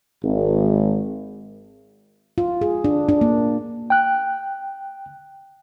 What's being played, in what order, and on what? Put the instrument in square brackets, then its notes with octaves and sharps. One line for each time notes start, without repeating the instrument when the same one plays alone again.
[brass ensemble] G#1
[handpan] F4
G#4
D4
D4
A#3
[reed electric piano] G5 F#6